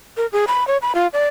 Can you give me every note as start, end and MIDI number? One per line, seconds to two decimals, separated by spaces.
0.17 0.26 70
0.32 0.45 68
0.48 0.66 83
0.68 0.78 73
0.82 0.93 83
0.95 1.07 65
1.13 1.27 74